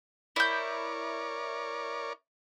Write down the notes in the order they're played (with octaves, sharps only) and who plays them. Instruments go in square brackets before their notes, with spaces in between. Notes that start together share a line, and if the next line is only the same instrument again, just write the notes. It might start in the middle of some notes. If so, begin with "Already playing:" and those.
[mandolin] E4 G6 [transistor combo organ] A#4 C#5 D5